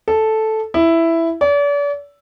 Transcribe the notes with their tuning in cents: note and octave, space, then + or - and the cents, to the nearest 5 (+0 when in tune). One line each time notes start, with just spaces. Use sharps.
A4 -5
E4 +5
D5 -40